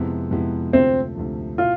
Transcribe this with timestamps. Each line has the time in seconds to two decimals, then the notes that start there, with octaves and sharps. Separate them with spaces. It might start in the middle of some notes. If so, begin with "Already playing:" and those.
Already playing: F2 C3 G#3 B3 E4
0.31 F2 C3 G#3 B3 E4
0.73 D2 C3 F3 A3 C4
1.15 D2 C3 F3 A3
1.58 B2 B3 E4 F4